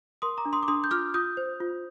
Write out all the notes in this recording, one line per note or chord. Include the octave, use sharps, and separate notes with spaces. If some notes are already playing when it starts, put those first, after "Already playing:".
A#4 C6 D#6
A#5 D6
D4
C6 D#6
D6
D4 C6 D#6
G6
F4 D6 F6
F4 D#6 G6
C5
F4